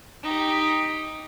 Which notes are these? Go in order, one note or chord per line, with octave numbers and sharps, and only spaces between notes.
D#4 G4